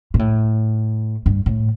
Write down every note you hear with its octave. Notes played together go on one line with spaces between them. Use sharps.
A#2
A2
G2
A2